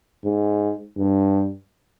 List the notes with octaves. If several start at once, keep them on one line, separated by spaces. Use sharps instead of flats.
G#2
G2